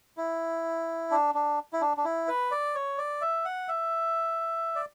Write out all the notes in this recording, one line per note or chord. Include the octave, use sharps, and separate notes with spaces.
E4
D4
D4
E4
D4
D4
E4
B4
D5
C#5
D5
E5
F#5
E5
D5